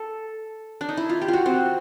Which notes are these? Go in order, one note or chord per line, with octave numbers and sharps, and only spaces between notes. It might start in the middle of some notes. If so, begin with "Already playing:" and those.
Already playing: A4
D4
D#4
E4
F4
G4
F4 F#4
C4